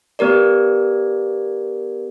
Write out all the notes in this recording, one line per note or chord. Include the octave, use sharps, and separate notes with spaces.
B3 G4 A#4 D5